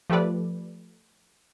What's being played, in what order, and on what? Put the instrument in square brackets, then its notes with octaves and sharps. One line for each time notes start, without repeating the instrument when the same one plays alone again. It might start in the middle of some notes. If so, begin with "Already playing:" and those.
[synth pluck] F3 A3 G4 A4 B4 D5